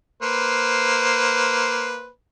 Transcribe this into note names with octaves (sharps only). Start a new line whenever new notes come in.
A#3 B4 C5